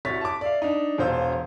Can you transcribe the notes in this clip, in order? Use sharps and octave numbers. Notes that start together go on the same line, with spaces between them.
C2 F#4 C#5 A6 B6
A5 D6
D5 E5 F5
D4 D#4
E1 F4 C5 E6